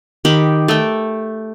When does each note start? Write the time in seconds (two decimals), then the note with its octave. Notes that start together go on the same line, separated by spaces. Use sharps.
0.25 D#3 G4 G5 B5
0.68 A3 G5